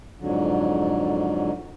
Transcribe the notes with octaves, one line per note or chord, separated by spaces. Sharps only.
F2 G#2 D3 F#3